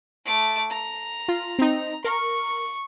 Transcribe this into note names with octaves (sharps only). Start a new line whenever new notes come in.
A3 D6
A#5
F4
C4 D#4
A#4 C#6